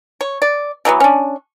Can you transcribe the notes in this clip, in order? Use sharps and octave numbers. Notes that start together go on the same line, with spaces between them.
C#5
D5
D3 E3 F#3 B3
C#4 D4